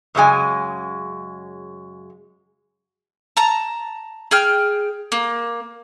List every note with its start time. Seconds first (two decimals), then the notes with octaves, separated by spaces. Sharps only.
0.15 F#2 C#3 G#3 G#5
3.37 A5 A#5
4.31 G#4 G5 F6
5.12 A#3